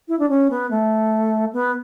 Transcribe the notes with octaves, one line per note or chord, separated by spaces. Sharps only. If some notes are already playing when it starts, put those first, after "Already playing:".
E4
D4
C#4
B3
A3
B3